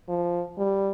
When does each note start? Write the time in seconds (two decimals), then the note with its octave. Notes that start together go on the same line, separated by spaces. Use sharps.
0.09 F3
0.58 G3